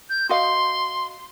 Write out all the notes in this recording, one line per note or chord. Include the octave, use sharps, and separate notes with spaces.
G6
F#4 D#5 F5 C6